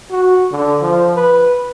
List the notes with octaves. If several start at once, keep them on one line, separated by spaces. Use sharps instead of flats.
F#4
D3
F3
B4